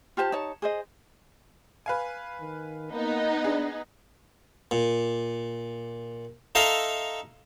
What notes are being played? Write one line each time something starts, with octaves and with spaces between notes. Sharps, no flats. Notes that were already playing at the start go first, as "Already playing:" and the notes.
F4 G4 C5 A5
D#4 C#5 A5
G#4 C5 D#5
B4 F5 G#5
D#3
A#3 B3 D#4
D4 G#4
A#2
D#4 A4 E5 F5 A#5 C6